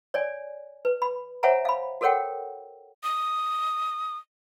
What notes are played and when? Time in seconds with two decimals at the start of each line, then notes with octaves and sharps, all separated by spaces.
0.14 C#5 D5 G#5
0.85 B4
1.02 B5
1.43 C5 C#5 E5 F#5 G#5 A#5
1.65 F5 B5
2.01 F#4 A4 A#4 C#5 F#5 G5
3.03 D#6